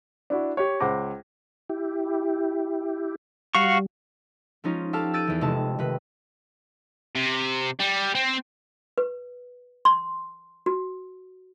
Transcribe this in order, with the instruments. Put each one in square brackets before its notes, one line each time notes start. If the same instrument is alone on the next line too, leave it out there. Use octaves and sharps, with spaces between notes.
[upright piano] D4 E4 F#4
G4 C#5
C#2 C5 F#5 D6 A#6
[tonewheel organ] E4 G4
[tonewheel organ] G3 [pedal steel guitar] F#4 F5 C#6
[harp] F3 G#3 C#4 D#4 F4
G4 A4 F5 A5 F6
E6 F#6 G6 A6 D7 D#7
E2 E3
F1 C3 G#3 A5
C3 D#3 B4
[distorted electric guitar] C3
G3
C4
[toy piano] B4
C6
F#4